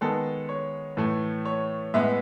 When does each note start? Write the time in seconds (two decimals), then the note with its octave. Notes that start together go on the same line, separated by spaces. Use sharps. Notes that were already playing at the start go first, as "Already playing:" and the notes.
0.01 D#3 G#3 B3 A4
0.49 C#5
0.97 A2 E3 A3
1.45 C#5
1.94 A2 G#3 B3 E5